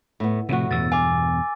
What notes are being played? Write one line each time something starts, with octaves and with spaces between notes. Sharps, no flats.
A2 B3
A2 C3 E3 F3 F#4
E2 G2 B2 E6 A6
F5 G#5 D6